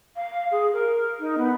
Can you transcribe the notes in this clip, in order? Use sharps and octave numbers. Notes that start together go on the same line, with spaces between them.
F5
G#4
A#4
D#4
B3